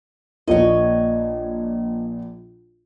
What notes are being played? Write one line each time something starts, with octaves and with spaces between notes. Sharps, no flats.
A#1 A#2 C#5 D#5